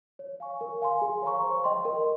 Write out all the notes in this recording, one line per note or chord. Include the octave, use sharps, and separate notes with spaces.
C#5
F5 G#5 C#6
A#4
F5 G#5 C6
G#4
C#5 F5 A#5 C#6
C5
D#5 G5 C6
A#4